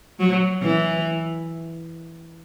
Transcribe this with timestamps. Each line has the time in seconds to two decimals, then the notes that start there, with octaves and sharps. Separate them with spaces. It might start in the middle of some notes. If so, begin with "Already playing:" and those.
0.20 F#3
0.63 E3